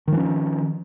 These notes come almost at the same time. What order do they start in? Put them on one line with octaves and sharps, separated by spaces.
D#3 F3 C#4